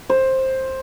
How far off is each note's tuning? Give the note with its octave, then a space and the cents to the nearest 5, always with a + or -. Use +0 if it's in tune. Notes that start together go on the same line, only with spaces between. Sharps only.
C5 +10